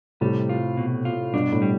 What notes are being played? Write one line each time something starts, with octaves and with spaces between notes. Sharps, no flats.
A2 C3 G3
F4
B2
F4
G2 B2 D4
A2
G3